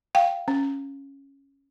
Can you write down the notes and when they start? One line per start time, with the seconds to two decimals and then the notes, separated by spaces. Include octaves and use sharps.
0.15 F5 G5
0.48 C#4